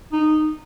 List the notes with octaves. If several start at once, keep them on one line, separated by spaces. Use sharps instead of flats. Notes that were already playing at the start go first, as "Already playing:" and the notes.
D#4